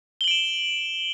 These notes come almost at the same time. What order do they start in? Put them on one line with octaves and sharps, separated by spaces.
G7 F#7 D7 E7